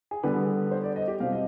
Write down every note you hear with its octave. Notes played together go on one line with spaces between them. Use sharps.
G#4
D3 G3 B3 B4
C5
D5
D#5
G4
B2 G3 C4 F5
D#5